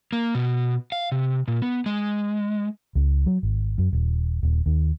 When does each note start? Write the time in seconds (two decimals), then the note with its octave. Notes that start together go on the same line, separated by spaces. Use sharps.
0.13 A#3
0.35 B2
0.92 F5
1.12 C3
1.48 A#2
1.62 B3
1.86 G#3
2.95 C#2
3.26 F#3
3.43 G#1
3.78 F#2
3.93 D#1
4.43 D#1
4.66 D#2